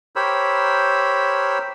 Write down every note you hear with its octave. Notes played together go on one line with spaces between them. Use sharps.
G4 A#4 C5 C#5 B5 E6